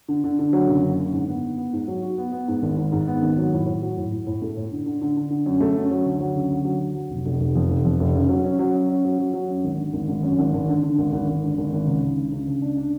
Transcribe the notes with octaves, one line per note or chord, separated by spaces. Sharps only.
D3
D3
D3
F#3
F#1
F#2
D3
G#2
B3
B3
B3
G#2
F#3
F#4
B3
B3
G#2
G#1
G#2
G#2
B3
G#1
F#3
A2
A2
F#3
A2
A2
A2
A3
A2
D3
D3
D3
D3
D3
F#2
A3
F#2
F#3
D2
F#3
C#3
D2
F#3
F#3
F#3
F1
F1
F1
F2
F1
F2
F1
C#3
F#3
C#4
F#3
C#4
C#4
F#3
F#3
F#3
F#2
G#1
D3
G#1
G#1
F#2
G#1
G#1
D3
D3
G#1
G#1
G#1
D3
G#1
G#1
C#2
C#2
D4
C#2
C#2
D4
D4